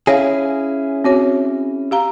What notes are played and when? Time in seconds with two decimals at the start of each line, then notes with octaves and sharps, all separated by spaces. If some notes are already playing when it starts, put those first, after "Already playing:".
0.07 C#4 E4 G#4 C#5 F5
1.04 C4 F#4 C#5
1.91 G4 F5 A#5